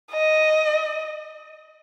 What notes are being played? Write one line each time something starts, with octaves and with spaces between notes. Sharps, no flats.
D#5